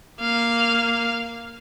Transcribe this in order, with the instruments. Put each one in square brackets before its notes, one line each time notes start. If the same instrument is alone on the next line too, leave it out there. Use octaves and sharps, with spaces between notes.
[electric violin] A#3 F5